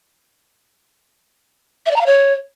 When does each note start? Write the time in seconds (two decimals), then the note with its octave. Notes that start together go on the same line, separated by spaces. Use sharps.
1.86 E5
1.91 D5
1.96 A#5
2.01 F5
2.06 C#5